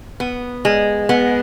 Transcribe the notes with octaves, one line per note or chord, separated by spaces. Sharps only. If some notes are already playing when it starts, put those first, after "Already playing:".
B3
G#3
B3